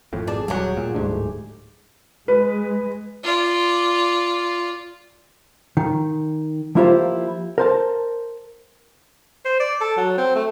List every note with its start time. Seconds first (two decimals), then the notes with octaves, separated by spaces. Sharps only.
0.13 G#1 F2 A2
0.27 B2 G#4 D5 A5
0.48 D#1 A2 F#3 G3 G4 G#4 F#5
0.77 A#2
0.95 D1 G#2 G3 A3 D4
2.28 G#3 B4
3.23 F4 D5
5.77 D#3
6.75 F3 A#3 E4 F4 G4 C5
7.58 A#4 C5 A5
9.46 C5
9.60 D5
9.81 A4
9.97 F#3
10.18 C4
10.36 A3